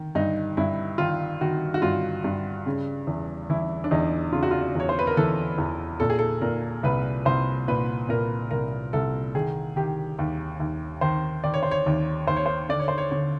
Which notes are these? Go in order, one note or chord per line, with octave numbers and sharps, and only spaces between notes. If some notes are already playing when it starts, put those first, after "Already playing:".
Already playing: D#3
G2 D#4
G2 E4
D#3 F4
D#3 F#4
F#4
G2 F4
G2
C#3
E2
E3 E4
D4
E2 D#4
C#3 F4
F#4
F4
E2 C#5
C5
B4
A#4
E3 A4
E2
A#2 A4
G#4
A4
A#2 A#4
C2 B4
C2 C5
A#2 B4
A#2 A#4
C2 A#4
C2 A4
D#3 G#4
D#3 G4
D#2
D#2
D#3 C5
D#3 D5
C#5
C5
C#5
D#2
D#2 C5
C#5
C5
D3 D5
C#5
C5
C#5
D3 C#5